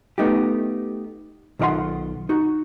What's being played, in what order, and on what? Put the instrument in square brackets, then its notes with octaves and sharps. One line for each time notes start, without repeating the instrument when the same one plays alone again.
[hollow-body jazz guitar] A3 B3 D#4 F4 G4
B1 D#3 F4 D5 F#5 C6
D#4 F#4